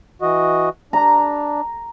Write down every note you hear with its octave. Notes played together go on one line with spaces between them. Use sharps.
E3 F#4 D#5
D4 A#5